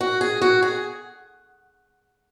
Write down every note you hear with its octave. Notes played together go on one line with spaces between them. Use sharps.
F#4
G#4
F#4
G#4